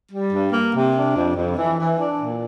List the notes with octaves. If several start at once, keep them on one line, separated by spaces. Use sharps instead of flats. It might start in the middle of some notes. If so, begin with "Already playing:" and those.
G3
G2
A#3
C3
D4
F2
F2
E3
E3
D4
A#2